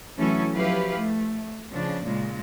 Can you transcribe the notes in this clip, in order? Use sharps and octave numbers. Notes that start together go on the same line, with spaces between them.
E3 F#3 A3 C#4 E4 A4
F3 F#3 E4 G4 B4 F5
A3
C#3 F3 D4
A#2 C#3 G#3